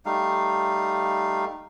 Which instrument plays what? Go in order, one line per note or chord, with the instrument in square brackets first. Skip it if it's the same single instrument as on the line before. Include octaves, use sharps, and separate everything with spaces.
[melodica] G3 A3 D#4 F5